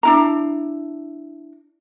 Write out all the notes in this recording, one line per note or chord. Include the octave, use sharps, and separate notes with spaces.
D4 E4 A#5